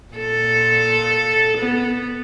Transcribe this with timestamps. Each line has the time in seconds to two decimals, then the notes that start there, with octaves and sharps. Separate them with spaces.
0.14 A#2 A4
1.57 B3